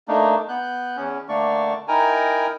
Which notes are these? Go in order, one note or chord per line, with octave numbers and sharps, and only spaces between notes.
A3 A#3 D4 D#4
B3 F#6 G6
E2 C#4
D3 A3 A#3 D4 D5 C#6
D#4 E4 A#4 G5 G#5 A#5